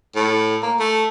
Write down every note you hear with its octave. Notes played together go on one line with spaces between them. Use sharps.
A2
A#3
A3